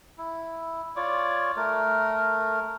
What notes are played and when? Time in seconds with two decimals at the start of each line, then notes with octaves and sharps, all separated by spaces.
0.18 E4
0.96 F4 C#5 D5
1.57 A3 A#4